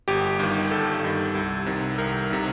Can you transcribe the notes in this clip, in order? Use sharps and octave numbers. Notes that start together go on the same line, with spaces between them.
G1 G4
G2 D#3
G1 A4
G2 D#3
C2
C3 D#3
C2 A#4
C3 D#3